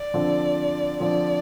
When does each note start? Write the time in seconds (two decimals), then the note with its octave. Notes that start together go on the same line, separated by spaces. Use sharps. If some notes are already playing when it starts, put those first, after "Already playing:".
Already playing: D5
0.14 D3 F3 C4 F4
1.00 D3 F3 C4 F4 D5